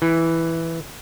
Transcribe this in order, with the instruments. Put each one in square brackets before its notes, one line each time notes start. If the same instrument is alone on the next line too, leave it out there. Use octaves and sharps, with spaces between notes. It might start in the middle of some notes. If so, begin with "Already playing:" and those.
[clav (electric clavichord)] E3